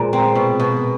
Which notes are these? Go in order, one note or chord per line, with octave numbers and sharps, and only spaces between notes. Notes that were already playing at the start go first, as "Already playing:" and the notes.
Already playing: A#2 F3 G#3
C4
B2
B2